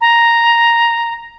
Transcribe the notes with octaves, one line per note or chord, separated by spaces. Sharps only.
A#5